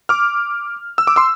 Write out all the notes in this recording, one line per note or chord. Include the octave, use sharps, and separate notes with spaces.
D6 F6
E6
D6
C6 E6